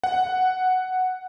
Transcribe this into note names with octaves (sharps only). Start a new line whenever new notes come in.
F#5